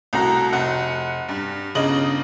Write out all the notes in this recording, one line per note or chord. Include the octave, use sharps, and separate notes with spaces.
C2 A2 F#4 A#5
F1 F#5
G2
G1 C#3 D#5 F#7